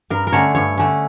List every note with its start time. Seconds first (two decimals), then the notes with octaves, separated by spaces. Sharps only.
0.10 G2 A#4
0.27 A#4
0.32 D3 A3 C#4 C#5
0.55 G2 C#5
0.78 D3 A3 C#4